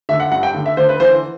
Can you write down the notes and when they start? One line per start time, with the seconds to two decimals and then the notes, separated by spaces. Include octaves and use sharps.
0.09 D3 E5
0.20 F#5
0.32 G2 F#5
0.43 G5
0.54 D3
0.66 E5
0.77 D3 C5
0.89 B4
1.00 E3 C5